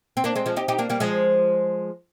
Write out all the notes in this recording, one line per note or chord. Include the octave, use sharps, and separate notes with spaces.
C4
A#3 D4
G#3 C4
F3 G#3
D#4 G4
D#4 G4
A#3 D4
G3 A#3
F3 G#3